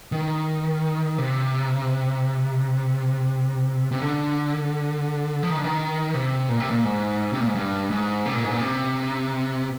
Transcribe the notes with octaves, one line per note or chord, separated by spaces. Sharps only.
D#3
C3
C3
D3
F3
D#3
D3
D#3
C3
A#2
C3
A#2
G#2
C3
A#2
G#2
G2
G#2
C3
A#2
G#2
A#2
C3